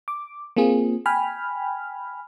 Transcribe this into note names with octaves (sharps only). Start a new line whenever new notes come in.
D6
A#3 C4 F4 G#4
G5 G#5 B5 F6